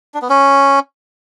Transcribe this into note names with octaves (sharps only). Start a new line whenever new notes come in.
D4
B3
C#4